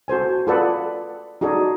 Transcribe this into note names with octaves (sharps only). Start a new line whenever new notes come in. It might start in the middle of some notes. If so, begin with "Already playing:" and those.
F#4 A4 C5 G#5
F4 G#4 A4 B4 D5 F#5
D#4 F#4 G#4 A4 D5